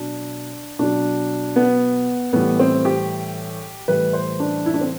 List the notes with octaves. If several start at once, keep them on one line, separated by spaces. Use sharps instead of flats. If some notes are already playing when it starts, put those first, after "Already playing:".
Already playing: B2 F#3 D4
B2 F#3 D4
B3
A2 E3 G3 B3
C4
G4
A2 E3 G3 B4
C5
D4
E4
D4
C4